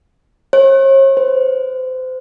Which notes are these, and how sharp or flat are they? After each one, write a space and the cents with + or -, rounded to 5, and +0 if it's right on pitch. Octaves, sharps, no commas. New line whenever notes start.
C#5 -45
C5 -30